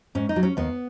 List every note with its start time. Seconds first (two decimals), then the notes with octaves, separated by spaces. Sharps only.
0.15 G#2 C#4
0.29 D#4
0.36 F#3
0.43 C#4
0.57 D#2 B3